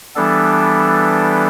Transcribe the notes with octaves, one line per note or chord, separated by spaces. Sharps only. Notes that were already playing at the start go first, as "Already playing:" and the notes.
E3 G3 B3 D4 A4